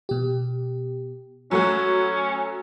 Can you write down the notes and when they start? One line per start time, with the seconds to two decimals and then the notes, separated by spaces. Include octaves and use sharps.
0.09 B2 G4
1.51 F#3 A3 C#4 F#4 B5